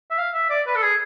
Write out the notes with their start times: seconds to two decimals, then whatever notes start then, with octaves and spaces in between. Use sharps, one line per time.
0.11 E5
0.18 F5
0.34 E5
0.50 D5
0.67 B4
0.75 A4
0.83 G#4